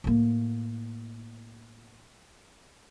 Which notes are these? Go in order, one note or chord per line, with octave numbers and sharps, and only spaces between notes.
A2 A#3